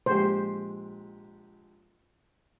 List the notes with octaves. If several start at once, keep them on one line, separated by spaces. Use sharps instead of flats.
A#1 G#3 G4 C5